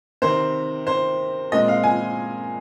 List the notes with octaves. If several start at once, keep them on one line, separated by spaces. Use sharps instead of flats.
C3 D#3 C4 C5
C5
A#2 G#3 C4 D#5
F5
G#5